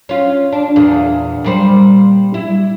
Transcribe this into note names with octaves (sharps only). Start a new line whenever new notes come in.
C#4 F4
D4
E2 A#2 G#4
A#2 G3 C5
E4